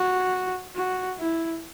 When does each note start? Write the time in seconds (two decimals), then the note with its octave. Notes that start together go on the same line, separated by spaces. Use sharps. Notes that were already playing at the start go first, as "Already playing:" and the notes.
Already playing: F#4
0.75 F#4
1.18 E4